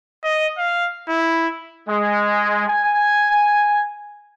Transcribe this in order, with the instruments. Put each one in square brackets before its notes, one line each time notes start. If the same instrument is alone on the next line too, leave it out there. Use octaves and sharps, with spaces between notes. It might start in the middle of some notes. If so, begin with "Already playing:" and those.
[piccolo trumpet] D#5
F5
E4
[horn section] G#3
G#5